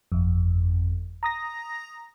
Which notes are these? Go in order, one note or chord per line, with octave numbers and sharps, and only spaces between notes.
G1 F2
A#5 D#6 A#6